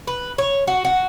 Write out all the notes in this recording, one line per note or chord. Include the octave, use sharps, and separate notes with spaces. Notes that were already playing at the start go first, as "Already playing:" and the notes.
B4
C#5
F#4
F#4